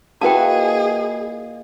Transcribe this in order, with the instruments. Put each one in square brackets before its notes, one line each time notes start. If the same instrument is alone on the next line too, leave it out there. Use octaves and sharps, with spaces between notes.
[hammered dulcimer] A#2 D#5 [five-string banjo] E4 F#4 B4 [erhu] G#4 [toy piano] G5 A5